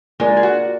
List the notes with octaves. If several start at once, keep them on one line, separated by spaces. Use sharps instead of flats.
G#3 A#3 F4 A#4 D5
G#4
F#4